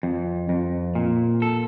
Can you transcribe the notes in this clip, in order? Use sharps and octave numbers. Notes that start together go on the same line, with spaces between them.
F2
F2
A#2
A4